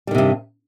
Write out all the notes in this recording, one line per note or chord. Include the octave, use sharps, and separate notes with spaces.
G2 C3 D#3 G3